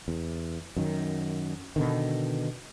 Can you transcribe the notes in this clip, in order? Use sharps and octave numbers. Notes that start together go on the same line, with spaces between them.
E2
F#2 D#3
B2 D3 D#3